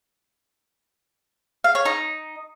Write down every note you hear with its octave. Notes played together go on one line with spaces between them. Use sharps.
F5
C#5
D#4